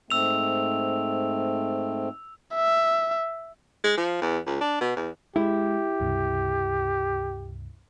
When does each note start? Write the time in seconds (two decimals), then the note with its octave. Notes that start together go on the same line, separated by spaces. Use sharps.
0.10 G#2 A3 C4 E6 F7
2.56 E5
3.84 G#3
3.97 F3
4.22 E2
4.46 C#2
4.61 D4
4.81 B2
4.97 E2
5.36 G#3 E4 G4
6.00 C#2 G2 C3